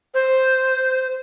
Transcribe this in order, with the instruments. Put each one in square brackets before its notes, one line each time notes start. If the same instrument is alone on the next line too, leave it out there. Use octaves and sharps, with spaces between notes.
[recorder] C5